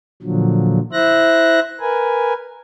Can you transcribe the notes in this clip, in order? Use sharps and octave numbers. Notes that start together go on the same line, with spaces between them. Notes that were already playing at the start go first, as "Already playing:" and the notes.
A#2 D3 F3 F#3
E4 C5 E5 F#6 A#6
A#4 B4 G#5